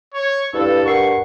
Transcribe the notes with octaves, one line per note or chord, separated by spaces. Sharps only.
C#5
G2 E4 A4 B4 F5
A#4 F#5 C#6 C7